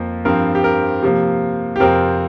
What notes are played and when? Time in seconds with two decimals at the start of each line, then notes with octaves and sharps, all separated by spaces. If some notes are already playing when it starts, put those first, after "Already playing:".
Already playing: F2 F3 A#3
0.25 G2 F3 C4 A#4
0.55 G4
0.64 A#4
1.03 C3 F3 A#3
1.76 G4
1.80 F2 C3 F3 C4 A#4